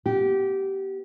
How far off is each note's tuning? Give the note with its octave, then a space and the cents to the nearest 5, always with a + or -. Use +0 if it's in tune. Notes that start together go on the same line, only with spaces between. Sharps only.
B3 +0 G4 -20